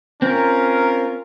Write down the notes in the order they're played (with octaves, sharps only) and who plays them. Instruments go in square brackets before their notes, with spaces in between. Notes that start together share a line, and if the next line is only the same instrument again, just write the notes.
[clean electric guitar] C4 [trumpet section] C#4 F4 A#4